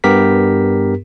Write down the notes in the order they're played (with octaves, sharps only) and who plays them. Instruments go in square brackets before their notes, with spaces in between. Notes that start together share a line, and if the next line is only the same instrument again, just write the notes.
[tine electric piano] G2 B3 G4 A#4 B6